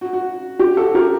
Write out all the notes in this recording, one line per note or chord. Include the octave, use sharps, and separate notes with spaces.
F#4
F#4
G4
F#4 A4
G4 A#4